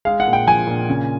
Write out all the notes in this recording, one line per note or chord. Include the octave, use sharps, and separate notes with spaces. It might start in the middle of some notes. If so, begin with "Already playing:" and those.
G#3 F5
F#5
A#2
G5
F3 G#5
A#2
C#3